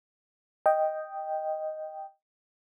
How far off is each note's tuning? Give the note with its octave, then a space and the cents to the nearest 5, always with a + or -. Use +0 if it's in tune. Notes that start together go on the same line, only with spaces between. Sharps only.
D#5 +0 G5 +0